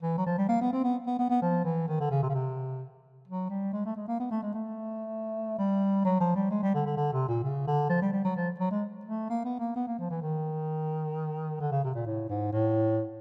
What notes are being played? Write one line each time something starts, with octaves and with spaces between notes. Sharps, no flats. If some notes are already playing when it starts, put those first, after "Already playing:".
E3
F#3
F3
G3
A#3
B3
C4
B3
B3
B3
B3
F3
E3
D#3
D3
C#3
C3
C#3
C3
F#3
G3
G#3
A3
G#3
A#3
B3
A3
G#3
A3
G3
F#3
F3
G3
G#3
G3
D3
D3
D3
C3
A#2
C#3
D3
F3
G3
G3
F#3
F3
F#3
G#3
A3
A#3
B3
A#3
B3
A#3
F3
E3
D#3
D3
C#3
C3
A#2
A2
G#2
A2